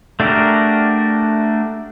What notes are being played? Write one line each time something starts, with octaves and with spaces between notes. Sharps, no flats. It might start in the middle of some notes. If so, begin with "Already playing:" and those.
A3 D4 F#4 G4 A#4